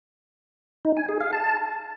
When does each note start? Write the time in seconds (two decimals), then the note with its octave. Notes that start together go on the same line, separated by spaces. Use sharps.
0.85 D#4
0.97 G#5
1.09 G#4
1.21 F5
1.33 A5